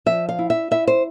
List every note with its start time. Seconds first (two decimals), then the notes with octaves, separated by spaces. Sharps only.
0.06 F3 E5
0.29 F5
0.39 E4
0.50 E5
0.71 E4 E5
0.87 C5